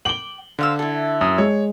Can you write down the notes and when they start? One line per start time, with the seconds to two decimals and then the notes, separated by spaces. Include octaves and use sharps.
0.05 G5 D6 F#7 G7
0.59 D3 C5 F5 E6
0.79 E4 A4
1.21 F#2 D#6
1.38 G#3 C#5